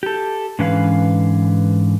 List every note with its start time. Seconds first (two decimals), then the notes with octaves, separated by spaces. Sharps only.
0.03 G4 A4
0.59 G#2 D3 E3 C#4 B4 F5